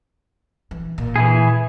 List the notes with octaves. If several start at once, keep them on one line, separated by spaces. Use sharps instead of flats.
E3
A#2
E3 E4 G#4